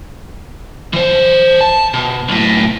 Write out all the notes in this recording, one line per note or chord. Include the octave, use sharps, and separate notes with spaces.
E3 C5
A5
B2
B1 A2